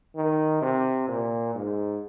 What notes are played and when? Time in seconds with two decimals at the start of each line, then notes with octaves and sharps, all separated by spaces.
0.15 D#3
0.62 C3
1.08 A#2
1.55 G#2